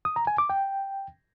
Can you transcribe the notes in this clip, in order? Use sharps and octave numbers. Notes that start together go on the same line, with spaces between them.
D#6
A#5
G#5
D6
G5